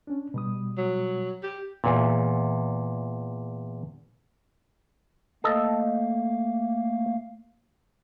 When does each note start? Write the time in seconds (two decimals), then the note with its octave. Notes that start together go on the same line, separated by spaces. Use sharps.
0.07 C#4 D4
0.34 B2 G3 D#6
0.78 F#3
1.43 G4
1.84 E2 A#2
5.44 A3 A#3 A4 D#5 F5